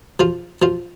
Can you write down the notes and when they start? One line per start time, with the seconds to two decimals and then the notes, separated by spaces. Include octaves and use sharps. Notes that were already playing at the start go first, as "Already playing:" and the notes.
0.20 F3 F4
0.62 F3 F4